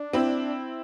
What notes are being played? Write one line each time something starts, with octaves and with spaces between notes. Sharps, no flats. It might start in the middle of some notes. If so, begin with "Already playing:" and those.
Already playing: D4
C4 E4